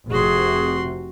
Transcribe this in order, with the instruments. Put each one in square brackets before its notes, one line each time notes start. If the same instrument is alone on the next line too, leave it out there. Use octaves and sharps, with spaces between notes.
[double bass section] F1 C3 [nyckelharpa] F#4 C6 [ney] G#4